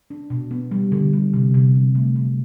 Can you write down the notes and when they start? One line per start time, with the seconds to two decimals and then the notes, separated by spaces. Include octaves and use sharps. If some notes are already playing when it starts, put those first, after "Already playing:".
0.10 D4
0.30 B2
0.51 B3
0.71 G3
0.92 D3
1.13 G3
1.34 C3
1.54 C3
1.75 F#3
1.95 A3
2.16 F#3